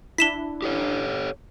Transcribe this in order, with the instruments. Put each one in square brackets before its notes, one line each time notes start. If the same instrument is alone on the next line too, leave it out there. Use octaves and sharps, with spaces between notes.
[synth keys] D4 E4 [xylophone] B6 E7 G7
[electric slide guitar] G4 A4 C#5